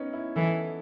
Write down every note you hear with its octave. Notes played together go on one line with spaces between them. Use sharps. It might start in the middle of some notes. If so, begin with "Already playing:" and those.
Already playing: B3 C#4 D#4
E4
E3 A4